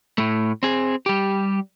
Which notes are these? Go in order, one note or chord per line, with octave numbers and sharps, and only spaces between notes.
A2 A3
C4 G#4
G3 G4